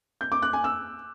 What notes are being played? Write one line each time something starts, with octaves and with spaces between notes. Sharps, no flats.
G6
D6
F#6
G#5
E6